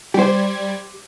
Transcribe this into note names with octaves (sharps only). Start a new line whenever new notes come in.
G3 G4 C5 G#6